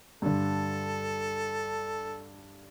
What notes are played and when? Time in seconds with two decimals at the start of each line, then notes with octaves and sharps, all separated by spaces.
0.22 G2 D3 A4